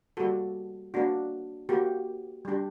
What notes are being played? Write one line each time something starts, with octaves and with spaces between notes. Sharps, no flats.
G3 A#3 F#4 A4
A#3 D4 F#4
A#3 F#4 G4
G3 D4 G4